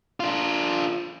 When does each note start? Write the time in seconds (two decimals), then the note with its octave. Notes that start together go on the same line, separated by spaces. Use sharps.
0.20 D4 F4